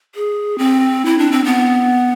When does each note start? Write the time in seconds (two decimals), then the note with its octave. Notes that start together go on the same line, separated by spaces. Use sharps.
0.15 G#4
0.58 C4
1.05 E4
1.19 D4
1.32 C4
1.45 B3